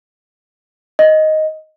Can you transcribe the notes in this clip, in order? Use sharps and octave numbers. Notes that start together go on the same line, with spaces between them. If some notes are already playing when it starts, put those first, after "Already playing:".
D#5